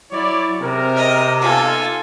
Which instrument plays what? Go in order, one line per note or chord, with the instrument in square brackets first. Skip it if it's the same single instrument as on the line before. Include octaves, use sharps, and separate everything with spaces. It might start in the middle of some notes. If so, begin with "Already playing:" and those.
[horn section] F#3 C#5 D5 [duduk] E4
[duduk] C3 [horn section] C4 G#4 A#4
[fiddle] D#5
[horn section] B3 D#4 F4 [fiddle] A4 G#5